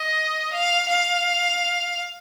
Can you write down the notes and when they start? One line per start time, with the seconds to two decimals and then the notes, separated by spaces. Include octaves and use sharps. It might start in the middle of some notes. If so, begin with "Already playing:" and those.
Already playing: D#5
0.53 F5
0.88 F5